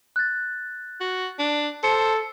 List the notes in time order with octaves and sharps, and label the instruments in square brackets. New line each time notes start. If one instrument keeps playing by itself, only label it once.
[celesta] F#6 A6
[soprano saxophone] F#4
D4
[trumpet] A4 [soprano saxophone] C5 [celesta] C#7